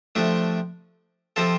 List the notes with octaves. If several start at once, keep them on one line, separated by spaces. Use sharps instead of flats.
C3 F3 A3 D4
C3 F3 C4 F4 A4